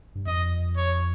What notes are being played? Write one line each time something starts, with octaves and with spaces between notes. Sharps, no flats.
G2
F2 D#5
C#5